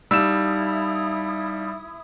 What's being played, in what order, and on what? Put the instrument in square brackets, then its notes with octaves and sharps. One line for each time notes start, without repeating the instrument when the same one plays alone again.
[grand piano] G3 E7 [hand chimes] D#4 F5 A5 [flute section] E4 D#6 [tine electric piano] E6